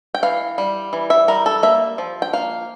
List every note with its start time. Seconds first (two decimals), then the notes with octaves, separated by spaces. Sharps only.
0.14 G5
0.23 E3 F5
0.58 G3
0.93 E3
1.10 E5
1.28 G3 A#4
1.46 A4
1.63 A#3 E5
1.98 F3
2.22 G5
2.33 A#3 F5